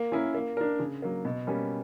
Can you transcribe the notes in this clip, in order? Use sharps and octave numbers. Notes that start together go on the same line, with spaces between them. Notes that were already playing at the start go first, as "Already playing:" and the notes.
Already playing: A#3
C#4 E4 A#4
A#3
D4 A#4
C#3
F#3 A#3
B2
G3 A#3 C#4